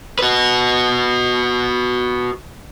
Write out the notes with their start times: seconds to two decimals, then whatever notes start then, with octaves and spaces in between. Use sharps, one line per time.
0.19 F#4 B4